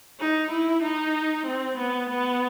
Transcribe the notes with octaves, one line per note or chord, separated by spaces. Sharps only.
D#4
E4
D#4
C4
B3
B3